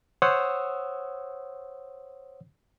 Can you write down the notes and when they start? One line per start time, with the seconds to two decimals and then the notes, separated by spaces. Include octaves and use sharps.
0.22 C5 C#5 F#5 D#6 E6